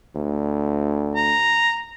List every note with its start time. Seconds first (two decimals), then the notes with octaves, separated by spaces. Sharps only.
0.16 D2
1.16 A#5